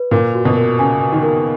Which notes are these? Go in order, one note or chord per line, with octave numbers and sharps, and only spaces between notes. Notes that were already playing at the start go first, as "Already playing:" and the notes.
Already playing: B4
A#2 A#4
F#4
B2
A#4
C#3 G#5
G#5
D#3
A#4